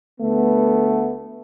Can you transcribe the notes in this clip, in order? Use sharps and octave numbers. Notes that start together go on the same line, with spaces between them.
D2 A3 B3